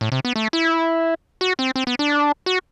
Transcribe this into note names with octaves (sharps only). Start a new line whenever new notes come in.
A2
C3
B3
A3
E4
F#4
C4
C4
B3
D4
F#4